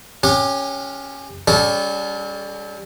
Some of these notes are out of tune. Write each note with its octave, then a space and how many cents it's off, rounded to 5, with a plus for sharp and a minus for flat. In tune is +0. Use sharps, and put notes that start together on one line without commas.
C#4 +0 G4 +25 F#5 -30
G3 +25 C#4 +35 A4 -30